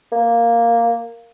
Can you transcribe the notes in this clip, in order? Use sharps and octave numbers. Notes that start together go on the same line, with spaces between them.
A#3